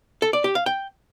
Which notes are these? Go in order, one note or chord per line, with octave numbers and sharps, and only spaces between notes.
A4
D5
G4
F5
G5